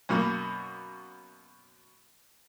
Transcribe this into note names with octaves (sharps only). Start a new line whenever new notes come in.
F#2 B2 A#3